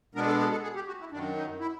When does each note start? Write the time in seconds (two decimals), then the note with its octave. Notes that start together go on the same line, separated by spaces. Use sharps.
0.15 B2 G#3 B3 D4 A#4
0.27 A4
0.39 G#4
0.51 A4
0.63 G#4
0.75 G4
0.87 F#4
1.00 E4
1.11 F#2 D#3 F#3 D4
1.36 D#4
1.60 E4